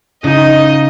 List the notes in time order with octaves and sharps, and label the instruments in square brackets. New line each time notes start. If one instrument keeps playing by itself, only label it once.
[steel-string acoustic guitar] C#3 [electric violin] D#4 [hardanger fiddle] D#5